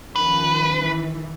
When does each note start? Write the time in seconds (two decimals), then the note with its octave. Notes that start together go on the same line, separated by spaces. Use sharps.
0.16 D#3 F3 C#4 B4
0.74 D#3 E3